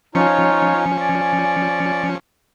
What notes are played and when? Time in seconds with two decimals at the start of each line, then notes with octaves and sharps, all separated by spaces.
0.15 F3 C#4 D#4 F4 C#5 G#5 C#7
1.00 D5